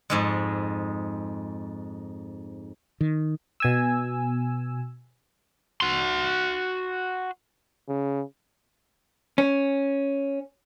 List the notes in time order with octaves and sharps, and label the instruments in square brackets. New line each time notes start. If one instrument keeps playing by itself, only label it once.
[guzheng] F2 G#2 G#3
[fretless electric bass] D#3
[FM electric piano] B2 G#5 E6
[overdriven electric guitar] F#4 C6
[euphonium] C#3
[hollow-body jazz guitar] C#4